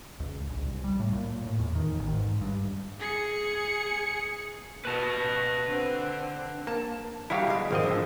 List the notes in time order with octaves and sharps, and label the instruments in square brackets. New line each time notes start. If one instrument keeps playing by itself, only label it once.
[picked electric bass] C#2
A#1
C2
G3
A2
A#2
A2
E2
D#3
A1
G#2
G2
[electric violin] G#4 C#7
[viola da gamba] B2 [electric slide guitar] B4 A5
[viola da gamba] D3 C4
[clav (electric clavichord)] A#3 [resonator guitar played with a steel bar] A5
[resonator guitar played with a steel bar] F#3 G3 F5 [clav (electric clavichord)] E4 F#4 G4
[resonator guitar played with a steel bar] B2 G#3
[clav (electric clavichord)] G#1 F3 D#5 [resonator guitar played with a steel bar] A#3 C4
[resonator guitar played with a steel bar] A2 D3